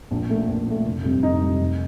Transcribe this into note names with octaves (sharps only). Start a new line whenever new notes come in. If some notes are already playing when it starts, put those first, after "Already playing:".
A#1
A#2 A3
A#1
A#2 A3
F1
F2 C3 G3
F1 D#4
F2 C3 G3
F1